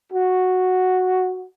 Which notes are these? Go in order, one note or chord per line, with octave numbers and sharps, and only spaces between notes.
F#4